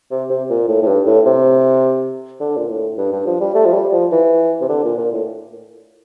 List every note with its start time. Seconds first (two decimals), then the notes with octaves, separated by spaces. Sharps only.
0.11 C3
0.30 C3
0.50 A#2
0.68 A2
0.83 A2
0.87 G2
1.07 A2
1.26 C3
2.40 D3
2.57 A#2
2.69 A2
2.98 G2
3.12 G2
3.26 F3
3.40 G3
3.55 A3
3.66 F3
3.74 G3
3.92 F3
4.12 E3
4.61 C3
4.69 D3
4.84 A#2
4.98 A#2
5.12 A2